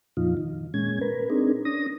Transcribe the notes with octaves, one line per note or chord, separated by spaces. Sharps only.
F2 A#2 F3 D#4 F4
D#3
A#2 G#3 C#4 G#6
A#4 B4
C4 D4 D#4 G#4 A#4
C#4 D4 D#6 A#6